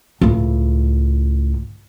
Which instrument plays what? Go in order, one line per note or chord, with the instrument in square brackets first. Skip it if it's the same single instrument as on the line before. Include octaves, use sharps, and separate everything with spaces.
[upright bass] C#2 A2